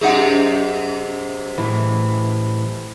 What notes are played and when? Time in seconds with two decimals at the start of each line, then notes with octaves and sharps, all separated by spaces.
0.01 F#2 C3 D#4 G#4 F#5
1.58 A2 E3